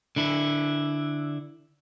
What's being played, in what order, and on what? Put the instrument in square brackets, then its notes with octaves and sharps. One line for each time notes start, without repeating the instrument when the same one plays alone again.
[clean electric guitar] D3 E4